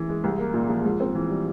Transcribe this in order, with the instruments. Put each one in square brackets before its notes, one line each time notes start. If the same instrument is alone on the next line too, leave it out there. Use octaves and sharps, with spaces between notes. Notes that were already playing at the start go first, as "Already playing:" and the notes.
Already playing: [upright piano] E3
G#3
C2
A#3
A#2
F3
G#2
C4
E3
G3